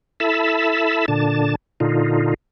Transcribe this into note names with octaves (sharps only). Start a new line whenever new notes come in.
E4 A4 E5 A5 B5
A#2 D3 D4 A5
A#2 D3 D#4 F4